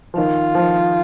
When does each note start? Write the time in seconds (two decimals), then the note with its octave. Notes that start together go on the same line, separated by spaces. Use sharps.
0.14 F3
0.17 D#3 F4
0.55 F3
0.61 D#3